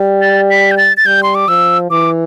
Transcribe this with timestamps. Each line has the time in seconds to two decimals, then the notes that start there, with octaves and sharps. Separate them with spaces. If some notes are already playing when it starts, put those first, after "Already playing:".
Already playing: G3
0.21 A6
0.50 B6
0.71 G6
0.77 A6
0.97 A6
1.06 G3 G6
1.23 C6
1.35 D6
1.48 F3 E6
1.91 E3 D6